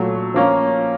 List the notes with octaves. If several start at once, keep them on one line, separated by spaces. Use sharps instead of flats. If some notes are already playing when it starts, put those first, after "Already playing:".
Already playing: A#2 F#3 A3
F3 A#3 C#4